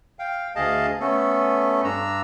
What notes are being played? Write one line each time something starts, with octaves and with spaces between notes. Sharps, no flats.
F5 G5
D2 G#4 D#5 F5 A5
A3 B3 C#4 A4
G2 D4 A#5 E6